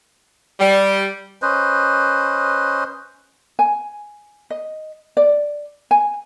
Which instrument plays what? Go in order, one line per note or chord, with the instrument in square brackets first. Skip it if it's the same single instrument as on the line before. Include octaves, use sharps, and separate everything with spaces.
[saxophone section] G3
[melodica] C#4 B4 C5 D#5
[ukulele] G#5
D#5
D5
G#5